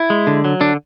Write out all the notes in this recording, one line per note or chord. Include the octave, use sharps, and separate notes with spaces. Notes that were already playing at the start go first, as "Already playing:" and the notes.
Already playing: E4
G#3
D3
F#3
D3 D4